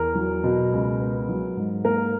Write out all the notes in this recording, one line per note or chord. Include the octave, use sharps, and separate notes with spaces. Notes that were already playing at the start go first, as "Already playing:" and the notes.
Already playing: E2 A#4
F#3
B2
C#2
B3
F#3
G#2
A#3 A#4